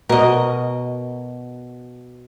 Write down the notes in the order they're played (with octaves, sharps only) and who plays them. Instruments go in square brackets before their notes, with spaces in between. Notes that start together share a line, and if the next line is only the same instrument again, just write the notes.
[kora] B2 F#4 [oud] A#4 D#5